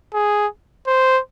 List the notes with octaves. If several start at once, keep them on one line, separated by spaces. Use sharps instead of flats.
G#4
C5